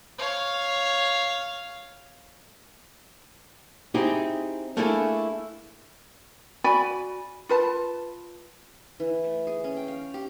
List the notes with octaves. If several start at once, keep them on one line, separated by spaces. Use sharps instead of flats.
C#5 F5
C4 D#4 E4 G4 G#4
A3 A#3 D4 E4 G#4 A4
F#4 D5 G#5 B5
F4 B4 A5
E3
A3
G#4
C#4
G5
F5
G4